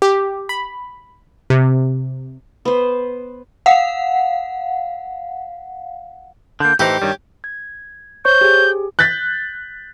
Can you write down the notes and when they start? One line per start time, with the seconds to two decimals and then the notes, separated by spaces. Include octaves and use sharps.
0.02 G4
0.49 B5
1.50 C3
2.65 B3 C5
3.66 F5 F#5
6.60 D3 A#3 G6
6.79 A2 E3 D#4 G4 C5
7.02 G2 D#3 G3 C#5
7.44 G#6
8.25 C5 C#5 C#6 G6
8.41 G4 G#4
8.99 F#6 G6 A6 B6